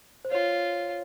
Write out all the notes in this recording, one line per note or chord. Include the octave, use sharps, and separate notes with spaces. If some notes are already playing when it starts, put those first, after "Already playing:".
C5
F4 C#5